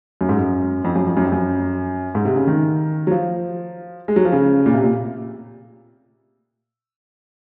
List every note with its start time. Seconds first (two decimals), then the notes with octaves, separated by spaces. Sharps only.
0.21 F#2
0.29 G#2
0.37 F#2
0.84 F2
0.95 F#2
1.07 F2
1.17 F#2
1.24 F2
1.32 F#2
2.15 G#2
2.25 C3
2.36 C#3
2.47 D#3
3.07 F#3
3.11 F3
4.08 G#3
4.16 F#3
4.25 F3
4.32 C#3
4.66 A#2
4.74 C3
4.84 A#2